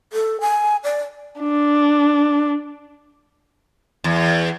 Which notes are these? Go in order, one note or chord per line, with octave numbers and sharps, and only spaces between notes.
A4
G#5
D5
D4
E2